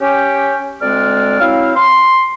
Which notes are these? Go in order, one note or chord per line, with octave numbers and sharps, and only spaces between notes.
C#4 G4
D2 G#3 C4 D5 F6
F#3 C4 E4 F5
C6